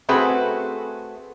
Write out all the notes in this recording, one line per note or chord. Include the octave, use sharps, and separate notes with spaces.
A3 C4 F#4 G#4 B4